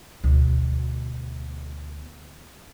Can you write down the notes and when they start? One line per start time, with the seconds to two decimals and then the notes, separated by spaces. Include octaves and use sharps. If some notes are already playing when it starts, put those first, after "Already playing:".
0.24 D2 B2